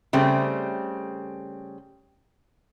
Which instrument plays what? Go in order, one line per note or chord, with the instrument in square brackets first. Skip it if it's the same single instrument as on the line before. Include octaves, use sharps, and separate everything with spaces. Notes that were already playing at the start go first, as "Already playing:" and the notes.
[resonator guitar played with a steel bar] C#3 G3 A3 C4